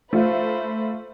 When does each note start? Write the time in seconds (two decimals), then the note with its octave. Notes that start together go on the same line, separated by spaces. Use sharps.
0.13 A3 F4 C5 B5